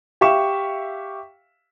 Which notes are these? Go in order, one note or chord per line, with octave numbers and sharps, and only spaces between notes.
G4 E5 F5 C#6 E7